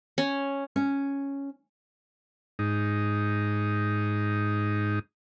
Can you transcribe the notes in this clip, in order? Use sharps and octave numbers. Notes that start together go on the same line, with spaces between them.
C#4
C#4
G#2 D#4